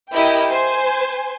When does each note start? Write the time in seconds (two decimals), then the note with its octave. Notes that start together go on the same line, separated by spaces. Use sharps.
0.15 E4 G4 A#4 D#5 E5 G5
0.51 C5 G#5